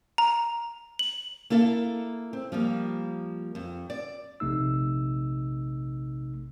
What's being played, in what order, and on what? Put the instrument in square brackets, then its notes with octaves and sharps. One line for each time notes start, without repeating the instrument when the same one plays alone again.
[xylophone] A#5
F#7
[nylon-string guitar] A#3 E4 A4 F5
C4
F3 G3 A#3
F2
D5
[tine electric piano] A#1 C3 A3 D#4 E6